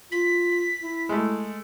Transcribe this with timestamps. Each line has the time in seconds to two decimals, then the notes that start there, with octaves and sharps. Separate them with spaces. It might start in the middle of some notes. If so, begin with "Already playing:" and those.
0.12 F4 B6
0.81 E4
1.09 G#3 A3